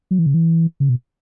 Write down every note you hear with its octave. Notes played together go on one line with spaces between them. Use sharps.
F#3
E3
C#3
E3
C#3
B2